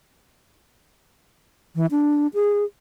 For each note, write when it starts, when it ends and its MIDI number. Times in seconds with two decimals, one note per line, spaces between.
1.76 1.86 52
1.91 2.27 62
2.34 2.64 68